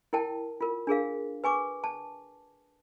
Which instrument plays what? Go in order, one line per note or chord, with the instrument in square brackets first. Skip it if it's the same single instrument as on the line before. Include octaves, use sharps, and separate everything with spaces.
[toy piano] E4 A#4 G5 A5
F4 A#4
D4 G#4 A#4 F5
B4 G#5 C#6 D6
A5